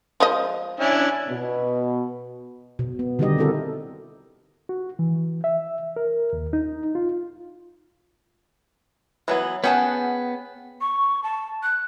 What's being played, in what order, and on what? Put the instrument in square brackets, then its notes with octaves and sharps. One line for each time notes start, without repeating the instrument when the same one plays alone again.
[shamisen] F3 G#3 D#5
[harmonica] C#4 D4 E4
[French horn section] B2
[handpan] B2
B3
D3 D#3 G3 D#4 G4 D#5
C4 E4 F#4 A4 A#4
[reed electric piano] F#4
E3
E5
A#4
D#2
D#4
F4
[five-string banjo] E3 F#3 B3
[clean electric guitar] B3 [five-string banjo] C#4 G#4 A5 [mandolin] F#5 G5
[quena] C#6
A5
F#6